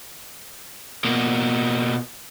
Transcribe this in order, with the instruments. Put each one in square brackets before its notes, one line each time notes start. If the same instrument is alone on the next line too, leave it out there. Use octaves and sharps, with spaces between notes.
[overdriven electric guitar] B2 A#3